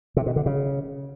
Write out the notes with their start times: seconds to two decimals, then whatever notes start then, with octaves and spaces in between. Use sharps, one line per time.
0.17 C3
0.26 B2
0.36 D3
0.46 C#3